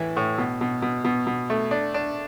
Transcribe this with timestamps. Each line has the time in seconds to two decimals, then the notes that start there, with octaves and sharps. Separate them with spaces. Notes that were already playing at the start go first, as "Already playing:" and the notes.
Already playing: A2 E3 E4
0.17 A2
0.38 B2
0.61 B2
0.82 B2
1.05 B2
1.27 B2
1.50 A3
1.71 D4
1.94 D4